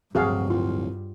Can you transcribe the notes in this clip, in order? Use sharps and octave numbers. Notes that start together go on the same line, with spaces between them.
D1 G2 C3 F3 F#3 F#4 G#4 F5
C2 F4